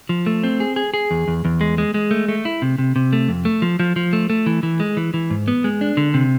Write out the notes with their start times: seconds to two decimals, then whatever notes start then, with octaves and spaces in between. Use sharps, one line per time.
0.09 F3
0.26 A3
0.43 C4
0.60 G#4
0.76 G#4
0.94 G#4
1.11 E2
1.28 E2
1.45 E2
1.61 G#3
1.78 G#3
1.94 G#3
2.11 A3
2.28 A3
2.45 E4
2.62 C3
2.78 C3
2.96 C3
3.13 A3
3.28 F2
3.45 A3
3.62 F3
3.80 F3
3.96 F3
4.13 A3
4.30 A3
4.46 E3
4.63 E3
4.80 G#3
4.97 E3
5.14 E3
5.30 G#2
5.48 B3
5.64 G#3
5.81 D4
5.97 D3
6.14 C3